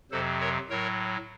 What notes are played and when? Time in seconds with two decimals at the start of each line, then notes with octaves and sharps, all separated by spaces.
0.11 F2 C3 F#3 A4 C5
0.41 A#4 C#5
0.70 A2 F#3 A#4 C#5